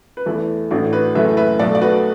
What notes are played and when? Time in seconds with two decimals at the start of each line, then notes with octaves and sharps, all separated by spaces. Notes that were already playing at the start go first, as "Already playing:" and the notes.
0.17 B4
0.26 E2 E3 A3 E4 A4
0.71 A1 A2 E3 A3 D4 F#4
0.93 F#4 B4
1.15 F#1 F#2 E3 A3 B4 E5
1.37 B4 E5
1.59 B1 B2 A3 A4 D5
1.75 D5
1.81 F#4 B4